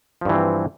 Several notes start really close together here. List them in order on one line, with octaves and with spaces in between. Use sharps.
F3 G2 E3 C4